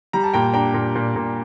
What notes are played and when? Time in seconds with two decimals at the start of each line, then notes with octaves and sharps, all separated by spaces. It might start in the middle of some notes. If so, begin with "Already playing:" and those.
0.13 G3 A#5
0.23 A5
0.34 A#2 G5 A#5
0.54 D4 G5 A#5
0.74 A#2
0.95 A#2
1.16 A#2